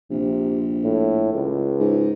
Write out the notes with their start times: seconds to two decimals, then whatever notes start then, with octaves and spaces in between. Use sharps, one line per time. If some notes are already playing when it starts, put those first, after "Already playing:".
0.11 A#1 C3
0.84 A2
1.33 C#2
1.80 G#2